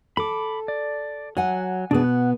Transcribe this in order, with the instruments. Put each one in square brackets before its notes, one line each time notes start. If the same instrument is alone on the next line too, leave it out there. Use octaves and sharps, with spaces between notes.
[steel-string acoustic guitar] A4 [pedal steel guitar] B5 D6
[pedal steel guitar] D5
[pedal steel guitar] F#3 [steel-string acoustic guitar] F#5 G#5
[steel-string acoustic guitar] B2 B3 [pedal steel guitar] D4 G#4
[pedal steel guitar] F#5